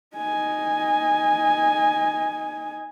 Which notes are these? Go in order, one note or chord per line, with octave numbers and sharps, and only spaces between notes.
D#4 G#5